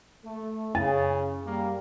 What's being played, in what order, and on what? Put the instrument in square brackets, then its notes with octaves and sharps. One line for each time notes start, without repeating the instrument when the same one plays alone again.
[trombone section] A3
[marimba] F#2 A6 [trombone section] C#3
[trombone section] G3 A#3